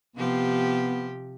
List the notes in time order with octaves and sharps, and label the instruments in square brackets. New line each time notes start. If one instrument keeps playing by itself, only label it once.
[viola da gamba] C3 F3 G4 [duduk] B3